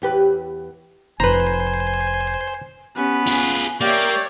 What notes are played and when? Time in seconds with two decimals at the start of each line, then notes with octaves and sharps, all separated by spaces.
0.02 E2 G4 B4
1.20 F1 F2 B4 C5 G#5 A#5
2.96 B3 C#4 G4 B4
3.27 F4 G#4 G#5
3.81 A#3 G4 C#5 D5 E5 G6